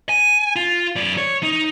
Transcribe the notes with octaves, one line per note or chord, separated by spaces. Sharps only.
G#5
F4
F#2 D5
C#5
D#4